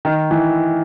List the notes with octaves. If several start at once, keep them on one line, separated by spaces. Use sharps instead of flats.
D#3
E3